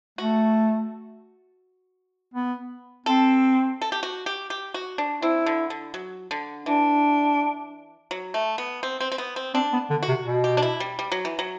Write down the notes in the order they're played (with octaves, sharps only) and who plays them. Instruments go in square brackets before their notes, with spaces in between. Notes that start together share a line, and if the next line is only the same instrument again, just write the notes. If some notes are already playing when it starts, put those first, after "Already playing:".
[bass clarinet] A3 [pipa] F#4
[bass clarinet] B3
[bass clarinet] C4 [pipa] A4
[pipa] A4
G4
F#4
G4
G4
F#4
D4
[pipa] C4 [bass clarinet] E4
[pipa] D3
D3
F#3
D3
[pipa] E3 [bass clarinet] D4
[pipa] F#3
A3
B3
C4
C4
C4
B3
C4
[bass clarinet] C4 [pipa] D4
[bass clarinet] B3
D3
[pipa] F#4
[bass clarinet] C3
B2
[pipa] G4
D4
E4
G3
G3
F#3
E3
F#3